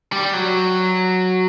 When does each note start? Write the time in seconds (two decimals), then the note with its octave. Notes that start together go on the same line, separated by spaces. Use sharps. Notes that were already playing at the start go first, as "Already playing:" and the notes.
0.13 G3
0.33 F#3